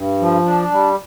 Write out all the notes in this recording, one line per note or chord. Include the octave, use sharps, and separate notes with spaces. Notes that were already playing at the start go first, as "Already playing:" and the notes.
Already playing: G2
F3
D4
G3